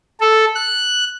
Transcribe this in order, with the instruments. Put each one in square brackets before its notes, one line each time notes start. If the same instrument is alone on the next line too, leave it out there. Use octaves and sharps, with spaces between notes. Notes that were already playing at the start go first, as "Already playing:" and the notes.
[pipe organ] A4
F#6